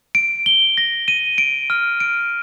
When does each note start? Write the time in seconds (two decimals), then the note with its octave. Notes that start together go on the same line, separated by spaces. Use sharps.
0.15 D7
0.46 G7
0.78 A#6
1.08 D#7
1.38 D7
1.70 F6
2.00 D7